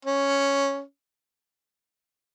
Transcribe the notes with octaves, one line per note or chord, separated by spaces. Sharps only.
C#4